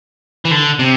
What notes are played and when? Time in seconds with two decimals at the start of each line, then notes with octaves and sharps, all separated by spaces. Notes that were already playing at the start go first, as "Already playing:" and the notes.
0.45 E3
0.51 D3
0.79 C3